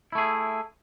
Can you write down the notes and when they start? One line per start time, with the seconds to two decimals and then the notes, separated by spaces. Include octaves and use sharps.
0.12 E4
0.15 A3
0.18 G#4